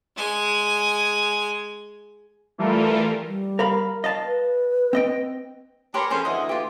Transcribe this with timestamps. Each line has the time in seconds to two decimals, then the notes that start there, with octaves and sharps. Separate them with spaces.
0.17 G#3 G#5
2.58 E3 G3 A3 F4 A4 A#4
3.24 G3
3.59 A#4 F5 B5
4.04 D#5 F5 A5
4.25 B4
4.93 C4 D#5 G5
5.94 D4 G4 A#4 B4 C#5 C6
6.10 F2 C#4 G#4 C5
6.25 D2 E3 D#5 F#5
6.49 F4 G4